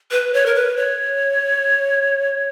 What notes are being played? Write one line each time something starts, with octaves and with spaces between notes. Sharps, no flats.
B4
C#5
A#4
B4
C#5